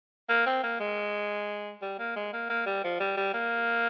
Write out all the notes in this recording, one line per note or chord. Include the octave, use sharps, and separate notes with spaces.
A#3
C4
A#3
G#3
G3
A#3
G#3
A#3
A#3
G3
F3
G3
G3
A#3